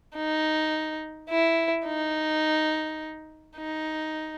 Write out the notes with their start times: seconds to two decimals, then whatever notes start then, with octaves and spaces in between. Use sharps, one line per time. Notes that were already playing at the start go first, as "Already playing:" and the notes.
0.16 D#4
1.30 E4
1.86 D#4
3.57 D#4